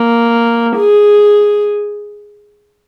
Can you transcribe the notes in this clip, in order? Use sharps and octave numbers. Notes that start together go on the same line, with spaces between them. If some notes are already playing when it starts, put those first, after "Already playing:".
Already playing: A#3
G#4